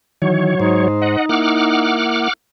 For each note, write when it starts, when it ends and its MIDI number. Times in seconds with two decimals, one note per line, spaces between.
0.22 0.55 51
0.22 0.55 52
0.22 0.88 54
0.22 0.88 73
0.60 1.16 44
0.60 2.10 63
0.60 1.16 72
1.02 1.26 75
1.02 1.26 78
1.29 2.28 58
1.29 2.28 64
1.29 2.33 78
1.29 2.33 86
1.29 2.33 89